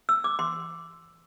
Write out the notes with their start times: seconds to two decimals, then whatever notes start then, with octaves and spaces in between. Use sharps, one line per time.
0.09 E6
0.24 D6
0.39 C6